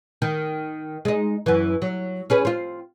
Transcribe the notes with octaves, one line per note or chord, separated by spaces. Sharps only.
D#3
G#3 D#4
F#2 E3
F#3
C#4 G#4 B4
C4 F4